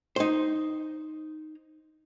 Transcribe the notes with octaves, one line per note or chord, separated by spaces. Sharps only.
D#4 C5